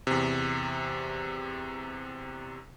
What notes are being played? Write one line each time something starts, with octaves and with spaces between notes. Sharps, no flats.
E2 C3